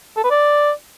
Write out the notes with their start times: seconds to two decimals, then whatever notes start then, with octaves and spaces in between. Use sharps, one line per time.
0.17 A4
0.24 B4
0.31 D5